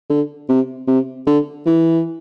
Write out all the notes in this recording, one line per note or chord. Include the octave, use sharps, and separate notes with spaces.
D3
C3
C3
D3
E3